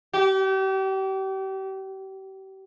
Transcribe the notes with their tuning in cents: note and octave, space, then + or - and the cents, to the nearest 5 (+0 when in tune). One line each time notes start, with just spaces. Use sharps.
G4 -35